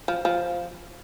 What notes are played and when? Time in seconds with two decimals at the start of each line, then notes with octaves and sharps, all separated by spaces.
0.08 F3
0.25 F3